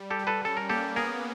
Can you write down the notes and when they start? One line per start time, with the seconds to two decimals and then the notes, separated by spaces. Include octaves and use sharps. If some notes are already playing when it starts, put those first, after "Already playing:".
Already playing: G3
0.10 G4 A4
0.19 G3
0.27 A4 B4
0.45 C#4 A4
0.57 A#4
0.69 A#3 G4 A4
0.96 B3 G#4 A#4